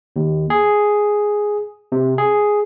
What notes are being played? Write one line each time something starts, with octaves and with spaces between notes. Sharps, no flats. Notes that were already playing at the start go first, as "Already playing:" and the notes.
D#2
G#4
C3
G#4